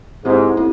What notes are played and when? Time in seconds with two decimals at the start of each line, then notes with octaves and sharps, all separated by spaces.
0.24 G#2 C4 E4 G4
0.57 C4 E4 G4